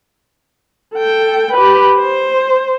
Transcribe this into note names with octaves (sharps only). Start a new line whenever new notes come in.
A4 G5
G4 B4
C5